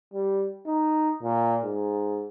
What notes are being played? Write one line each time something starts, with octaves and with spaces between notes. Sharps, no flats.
G3
D#4
A#2
G#2